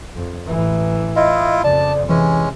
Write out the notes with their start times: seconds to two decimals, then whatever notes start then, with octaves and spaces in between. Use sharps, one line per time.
0.16 F2
0.48 A1 E3
1.16 E4 F4 D#5
1.64 F2 C#3 D5 A5
2.09 C3 E3 G#3 C#4